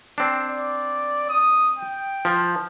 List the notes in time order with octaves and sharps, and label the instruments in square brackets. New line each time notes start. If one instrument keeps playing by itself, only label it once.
[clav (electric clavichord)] C4 D4
[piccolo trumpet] D5
D#6
G5
[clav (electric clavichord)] F3